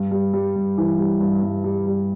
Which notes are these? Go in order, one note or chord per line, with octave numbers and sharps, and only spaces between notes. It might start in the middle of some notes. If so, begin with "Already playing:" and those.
Already playing: G2
G3
G3
G2
E3
G3
G2
G2
G3
G3